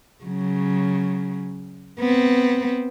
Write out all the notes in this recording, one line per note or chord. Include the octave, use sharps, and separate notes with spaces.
C#3 F#3
B3 C4